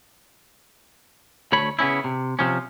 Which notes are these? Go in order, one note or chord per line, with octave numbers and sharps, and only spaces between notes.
D2 A3 C#5 B5
C#3 B3 C#4 E4
C3
C3 F3 C#4